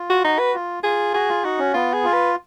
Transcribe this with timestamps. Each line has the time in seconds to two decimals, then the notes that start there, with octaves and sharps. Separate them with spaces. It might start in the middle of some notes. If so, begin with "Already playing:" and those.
Already playing: F4
0.10 F#4
0.24 D#4 F#4
0.39 B4
0.54 F4
0.83 F4 G#4
1.14 F#4 G#4
1.29 F4
1.44 D#4 F#4
1.59 C#4
1.74 B3 F4
1.93 G#4
2.04 F4
2.13 B4